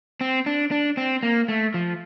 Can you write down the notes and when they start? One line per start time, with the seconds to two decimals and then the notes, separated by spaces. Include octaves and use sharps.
0.21 C4
0.46 D4
0.71 D4
0.97 C4
1.23 A#3
1.49 A3
1.74 F3